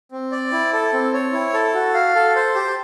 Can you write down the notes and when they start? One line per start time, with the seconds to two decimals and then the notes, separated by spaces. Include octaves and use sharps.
0.12 C4
0.32 D5
0.52 E4
0.73 A4
0.93 C4
1.14 C#5
1.33 E4
1.54 A4
1.74 F#4
1.94 F5
2.15 A4
2.36 C5
2.55 G4